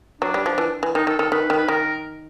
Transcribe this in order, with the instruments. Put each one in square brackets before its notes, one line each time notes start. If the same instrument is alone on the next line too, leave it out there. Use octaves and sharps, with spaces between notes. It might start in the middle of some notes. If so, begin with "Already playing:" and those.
[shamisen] F#3 [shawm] D4
[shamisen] G3
F3
E3
E3
[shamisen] D#3 [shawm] D#4
[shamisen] D#3 [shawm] A4
[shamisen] D#3 [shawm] A4
[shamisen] D#3 [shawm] B4
[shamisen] D#3
[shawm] B4
[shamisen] D#3 [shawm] A#4